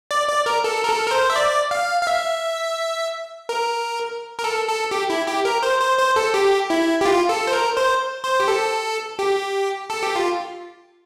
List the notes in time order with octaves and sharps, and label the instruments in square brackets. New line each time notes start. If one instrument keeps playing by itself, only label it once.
[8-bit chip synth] D5
D5
A#4
A4
A#4
A4
A#4
C5
E5
D5
F5
F5
E5
A#4
A#4
A4
A4
G4
E4
G4
A#4
C5
C5
C5
A4
G4
E4
G4
F4
A4
C5
A#4
C5
C5
G4
A4
G4
A4
G4
F4